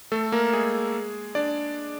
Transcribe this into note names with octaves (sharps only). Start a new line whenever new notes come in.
A3 A4
A#3 A#4
G#3 G#4
D4 D5